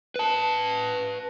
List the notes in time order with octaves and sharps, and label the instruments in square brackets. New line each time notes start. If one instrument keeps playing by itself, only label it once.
[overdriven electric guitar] B4 A5